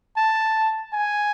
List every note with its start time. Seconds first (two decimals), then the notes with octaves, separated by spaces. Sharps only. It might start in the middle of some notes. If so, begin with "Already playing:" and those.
0.17 A5
0.94 G#5